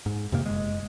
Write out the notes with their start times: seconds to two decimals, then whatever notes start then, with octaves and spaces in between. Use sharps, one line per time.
0.06 G#2
0.32 F2 C3 D#3 A#3
0.46 F#1 G#3